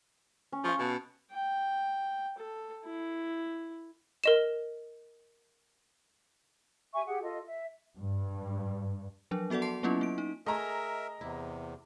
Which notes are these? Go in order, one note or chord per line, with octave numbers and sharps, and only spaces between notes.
C#4
F3 F5 C#6
B2 A5
G5
A4
E4
A#4 D#5 E7
G4 E5 G#5 C#6
G4 G#4 F#5
F4 A4 D#5
E5
G2
F3 F#3 D4
B3 F#4 A4 D5 F#5
A5 C6 C7
F#3 A#3 B3 C#4 E4 F4
A#3 D7
D#4
A3 G#4 A#4 D#5 E5 A#5
E2 C3 E4